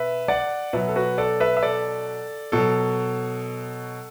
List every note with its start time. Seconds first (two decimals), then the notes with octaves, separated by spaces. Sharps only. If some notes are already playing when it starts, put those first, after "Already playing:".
Already playing: B2 B4 E5
0.28 D5 F#5
0.73 B2 F#3 B4 E5
0.88 A4
0.96 F#4 B4
1.18 A4 D5
1.40 B4 E5
1.57 E5
1.63 A4 D5
2.52 B2 F#3 A4